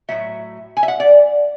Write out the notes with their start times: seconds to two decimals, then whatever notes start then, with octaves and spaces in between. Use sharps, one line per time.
0.08 A2 F#3 A3 E5
0.77 G#5
0.83 E5
0.88 F#5
1.00 D5